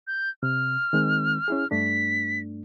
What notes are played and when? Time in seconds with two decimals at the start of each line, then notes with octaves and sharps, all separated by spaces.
0.07 G6
0.43 C3 F6
0.93 D#3 G#3 C4
1.48 C#4 E4 G#4
1.71 G2 A3 D4 B6